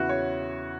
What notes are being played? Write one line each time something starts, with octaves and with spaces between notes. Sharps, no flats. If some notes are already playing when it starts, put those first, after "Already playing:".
Already playing: E2 C#3 E3 E4 F#4
C#5